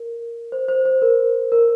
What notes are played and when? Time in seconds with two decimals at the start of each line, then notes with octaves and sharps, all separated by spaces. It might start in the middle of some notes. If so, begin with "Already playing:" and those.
Already playing: A#4
0.52 C5
0.68 C5
0.85 C5
1.02 A#4
1.52 A#4